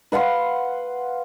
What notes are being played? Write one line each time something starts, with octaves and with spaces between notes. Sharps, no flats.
B4 F5 F#5 C6